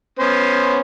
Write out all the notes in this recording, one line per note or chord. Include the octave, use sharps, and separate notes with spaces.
B3 C#4 C5